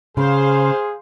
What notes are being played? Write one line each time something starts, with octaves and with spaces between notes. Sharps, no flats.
C#3 G#4 C5 F5